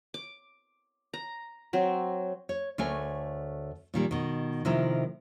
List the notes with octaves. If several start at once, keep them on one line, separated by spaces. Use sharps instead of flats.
D6
A#5
F#3 C4
C#5
D2 A3 A#4 C#5 G#5
A#2 D#3 G3
B2 D#3
C3 D#3 F3 A3 E4 A#4